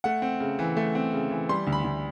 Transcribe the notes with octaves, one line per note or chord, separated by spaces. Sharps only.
A3 F#5
C4
C#3
E3
A3
C4
C#3
E3
G3 C6
D2
B5
D2